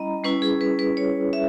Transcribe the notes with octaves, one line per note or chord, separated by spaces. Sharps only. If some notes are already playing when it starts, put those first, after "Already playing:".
Already playing: G3 C#4 E4 D#5 A#5 B5
G3 C#4 E4 B4
G#4
B4
B4
C#5
E5